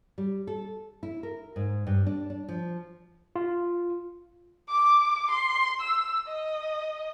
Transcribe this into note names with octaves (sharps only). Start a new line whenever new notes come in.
G3
A4
E4
A#4
G#2
G2
D4
D4
F3
F4
D6
C6
E6
D#5